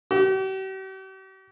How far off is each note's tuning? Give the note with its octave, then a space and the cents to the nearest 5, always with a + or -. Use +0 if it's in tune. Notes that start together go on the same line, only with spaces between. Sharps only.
G4 -45